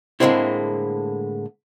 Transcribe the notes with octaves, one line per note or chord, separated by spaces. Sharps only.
A2 D3 G#3 A#3 C4 E4